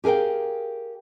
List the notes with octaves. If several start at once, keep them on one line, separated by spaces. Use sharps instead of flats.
G4 G#4 A#4 F5 G5